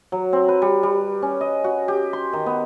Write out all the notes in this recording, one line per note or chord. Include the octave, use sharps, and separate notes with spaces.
F#3
C4
B4
G3
G3
C#4
D#5
F#4
G4
C6
D#3
B3